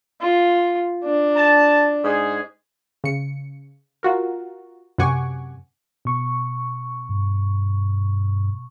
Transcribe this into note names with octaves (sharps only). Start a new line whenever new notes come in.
F4
D4
A5
G#2 G#4
C#3 C#7
F4 F#4 A#4
F#2 C3 F#5 G#5 C#6 D6
B2 C#6
G2